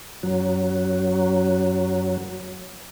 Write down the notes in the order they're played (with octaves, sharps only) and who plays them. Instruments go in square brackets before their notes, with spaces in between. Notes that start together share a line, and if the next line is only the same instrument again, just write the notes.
[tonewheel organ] F#2 F#3